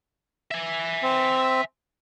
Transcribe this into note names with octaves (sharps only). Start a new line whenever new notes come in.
E5 G#5
C4